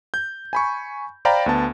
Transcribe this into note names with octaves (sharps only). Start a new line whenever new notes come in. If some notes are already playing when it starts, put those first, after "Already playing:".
G6
G#5 B5 C#6
C5 D5 F5 G5 A#5 B5
D2 B3 A5